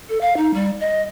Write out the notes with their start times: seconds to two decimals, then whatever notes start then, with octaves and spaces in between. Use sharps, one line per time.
0.09 A4
0.21 F5
0.37 D#4
0.54 G3
0.80 D#5